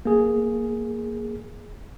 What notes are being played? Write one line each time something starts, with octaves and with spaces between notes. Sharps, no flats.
A#3 G#4